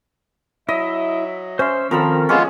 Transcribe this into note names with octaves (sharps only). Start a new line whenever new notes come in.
F#3 E4 D#5 E5
C#4 C5 E5 C6
D#3 F3 C4 A4 A#4 A#5 B5
G#3 B3 C#4 F4 G4 G#4 E6